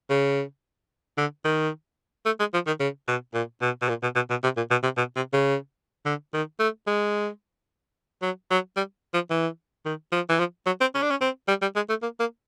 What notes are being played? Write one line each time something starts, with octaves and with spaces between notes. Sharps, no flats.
C#3
D3
D#3
A3
G#3
F3
D#3
C#3
B2
A#2
B2
B2
A#2
B2
B2
B2
C3
A#2
B2
C3
B2
C3
C#3
D3
D#3
A3
G#3
F#3
F#3
G3
F3
E3
D#3
F3
E3
F3
F#3
C4
C#4
D4
C#4
C4
G3
G3
G#3
A3
A#3
A#3